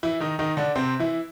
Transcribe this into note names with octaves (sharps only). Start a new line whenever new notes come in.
E3 E4
D#3 D#4
D#3 D#4
D3 D4
C3 C4
E3 E4